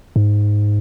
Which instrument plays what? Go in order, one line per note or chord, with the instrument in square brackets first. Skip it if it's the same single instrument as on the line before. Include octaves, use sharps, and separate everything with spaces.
[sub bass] G#2